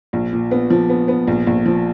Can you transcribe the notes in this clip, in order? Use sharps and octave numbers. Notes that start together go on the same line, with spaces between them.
A#1
A#2
B3
F3
B3
B3
A#1
A#1
F3